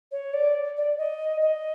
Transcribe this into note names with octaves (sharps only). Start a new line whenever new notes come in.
C#5
D5
D5
D#5
D#5